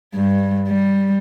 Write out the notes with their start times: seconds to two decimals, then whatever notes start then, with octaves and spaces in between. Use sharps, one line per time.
0.15 G2
0.68 G3